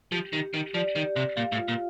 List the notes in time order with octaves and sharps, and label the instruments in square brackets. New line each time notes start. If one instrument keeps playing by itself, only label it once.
[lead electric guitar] F3 [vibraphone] G4
[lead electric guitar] D#3 [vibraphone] G4
[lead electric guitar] D#3 [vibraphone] G4
[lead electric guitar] F3 [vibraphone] D5
[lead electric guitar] D#3 [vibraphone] G4
[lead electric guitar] C3 [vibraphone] G4
[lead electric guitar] A#2 [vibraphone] F5
[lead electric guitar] A2
[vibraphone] F4
[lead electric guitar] A#2